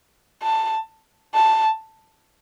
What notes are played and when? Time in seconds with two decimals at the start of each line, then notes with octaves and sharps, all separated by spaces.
0.43 A5
1.35 A5